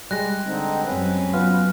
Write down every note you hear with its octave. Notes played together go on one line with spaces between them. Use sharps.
G3 G#3 F#6 A#6
D3 C4 D#4
F#2 C4 C#4 B4
F#3 B3 F4 F6